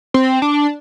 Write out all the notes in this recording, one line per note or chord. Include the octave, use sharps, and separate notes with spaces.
C4
D4